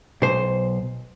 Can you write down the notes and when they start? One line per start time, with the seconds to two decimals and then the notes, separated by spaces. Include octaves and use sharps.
0.22 B1 C5